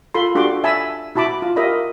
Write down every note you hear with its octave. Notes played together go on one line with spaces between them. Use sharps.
F4 A4 B5 C6
D4 F#4 G4 A4 C6 D6
E5 G#5 A5 B5 E6
E4 F#4 A5 B5 D6
F4
G4 A#4 D#5 E5 B5